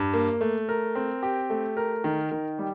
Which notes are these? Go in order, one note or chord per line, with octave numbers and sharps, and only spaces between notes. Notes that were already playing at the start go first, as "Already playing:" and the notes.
Already playing: G2
A#3
A3
A#4
C4
G4
A3
A#4
D#3
D#3
G3